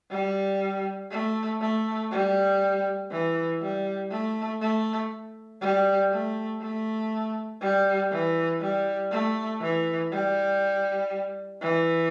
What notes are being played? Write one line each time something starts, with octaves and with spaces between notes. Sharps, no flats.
G3
A3
A3
G3
E3
G3
A3
A3
G3
A3
A3
G3
E3
G3
A3
E3
G3
E3